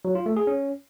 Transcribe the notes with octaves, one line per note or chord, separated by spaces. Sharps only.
F#3
F4
A3
G#4
C#4